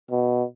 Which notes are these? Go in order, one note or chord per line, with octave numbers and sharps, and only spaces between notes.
B2